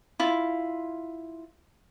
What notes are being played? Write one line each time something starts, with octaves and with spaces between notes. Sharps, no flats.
E4 F4